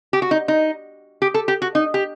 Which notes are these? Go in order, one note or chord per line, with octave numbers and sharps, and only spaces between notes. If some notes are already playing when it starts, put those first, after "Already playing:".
G4
F#4
D#4
D#4
G4
A4
G4
F#4
D#4
G4